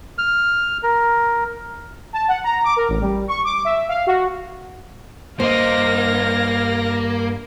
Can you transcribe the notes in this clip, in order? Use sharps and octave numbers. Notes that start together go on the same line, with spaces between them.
F6
A#4
A5
F#5
A#5
D6
A#4
A1
G3
C#6
D6
E5
F5
F#4
G2 A#3 C5 D#5 F5 A#6